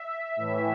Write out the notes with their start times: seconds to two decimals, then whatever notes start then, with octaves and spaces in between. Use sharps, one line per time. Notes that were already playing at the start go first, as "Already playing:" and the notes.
Already playing: E5
0.36 A2 E3